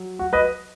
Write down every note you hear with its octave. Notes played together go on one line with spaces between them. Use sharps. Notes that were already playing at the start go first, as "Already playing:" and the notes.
Already playing: F#3
F#4
B4 D#5